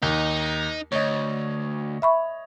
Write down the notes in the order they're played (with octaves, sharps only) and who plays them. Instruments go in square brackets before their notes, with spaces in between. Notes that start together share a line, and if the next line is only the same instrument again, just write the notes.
[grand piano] D#2 [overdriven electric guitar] D#4
[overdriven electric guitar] D2 [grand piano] C#5 D#5
[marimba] E5 B5 C#6